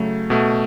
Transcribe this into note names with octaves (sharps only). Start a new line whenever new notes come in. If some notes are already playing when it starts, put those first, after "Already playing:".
Already playing: C#3 F#3 A3
B2 A3